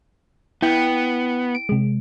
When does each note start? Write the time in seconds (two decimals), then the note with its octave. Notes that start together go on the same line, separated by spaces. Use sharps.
0.62 B3 E4 G5
1.55 D7
1.69 C3 G#3